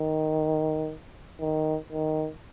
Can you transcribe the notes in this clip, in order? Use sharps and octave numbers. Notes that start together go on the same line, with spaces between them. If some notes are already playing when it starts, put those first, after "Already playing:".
Already playing: D#3
D#3
D#3